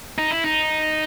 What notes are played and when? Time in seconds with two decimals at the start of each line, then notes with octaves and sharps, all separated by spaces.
0.18 D#4
0.31 E4
0.44 D#4